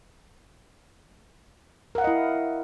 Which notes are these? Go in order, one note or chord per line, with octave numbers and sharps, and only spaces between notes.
E4 A#4 D#5 F5 F#5